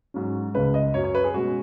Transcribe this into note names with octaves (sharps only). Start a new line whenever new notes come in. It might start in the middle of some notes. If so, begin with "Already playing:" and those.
G#2 F#3 C#4
C#2 C#3 G#3 B4
D#5
F#2 F#3 C#4 C#5
C#5
B4
G#4
B2 G#3 C#4 F#4